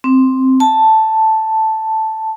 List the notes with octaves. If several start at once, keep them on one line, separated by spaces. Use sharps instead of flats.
C4
A5